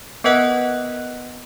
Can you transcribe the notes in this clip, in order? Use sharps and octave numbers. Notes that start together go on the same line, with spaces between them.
B3 A#4 B4 D#5 F#5 F#6